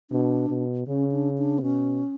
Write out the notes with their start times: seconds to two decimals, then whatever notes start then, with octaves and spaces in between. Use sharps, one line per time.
0.11 B2 D4
0.49 B2
0.87 C#3 C#4
1.12 D4
1.38 D4
1.58 B3
1.62 B2 C#4